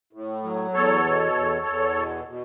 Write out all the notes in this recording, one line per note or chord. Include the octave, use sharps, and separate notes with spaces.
A2
F#3
E2 A4 C#5
B2
E2
E2
B2
B2